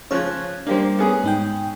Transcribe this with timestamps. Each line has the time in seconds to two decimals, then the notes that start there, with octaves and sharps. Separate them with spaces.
0.11 C#3 F3 C#5 F#6 G#6
0.67 G3 A#3 D4 G4 C5
0.99 B3 C#4 G#4
1.24 G#2 D#4 G5